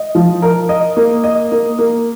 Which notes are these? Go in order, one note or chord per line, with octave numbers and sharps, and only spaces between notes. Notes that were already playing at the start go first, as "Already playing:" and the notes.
Already playing: D#5
F3
A#4
D#5
A#3
D#5
A#3
A#3